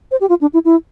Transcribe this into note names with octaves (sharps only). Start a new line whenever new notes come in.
C5
G4
F4
D4
E4
E4